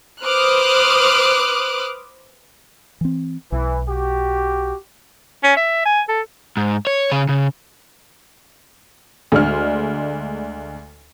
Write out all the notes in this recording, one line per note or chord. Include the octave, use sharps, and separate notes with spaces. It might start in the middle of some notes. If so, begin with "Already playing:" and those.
B4 C5 D6 D#6 F6 F#6
E3 C4
B1 E3
F#4 G4
C#4
E5
G#5
A4
G#2
C#5
C#3 G#4
C#3
D2 G#3 D4 F6